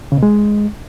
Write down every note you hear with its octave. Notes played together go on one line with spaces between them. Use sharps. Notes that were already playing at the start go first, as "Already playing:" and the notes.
C#3
B2
G#3